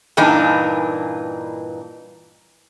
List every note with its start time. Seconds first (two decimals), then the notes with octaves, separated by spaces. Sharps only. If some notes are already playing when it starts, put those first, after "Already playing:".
0.17 G2 A#2 E3 A#3 D4 D#4